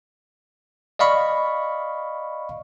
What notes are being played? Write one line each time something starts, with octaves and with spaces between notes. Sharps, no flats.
D5 D#5 F5 B5 C#6